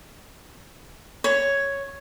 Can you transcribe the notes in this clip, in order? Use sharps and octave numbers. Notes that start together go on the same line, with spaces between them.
C#5